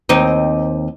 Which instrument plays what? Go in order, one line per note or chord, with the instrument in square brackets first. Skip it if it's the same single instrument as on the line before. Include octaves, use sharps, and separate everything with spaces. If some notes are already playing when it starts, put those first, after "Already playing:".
[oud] D#2 C4 D#4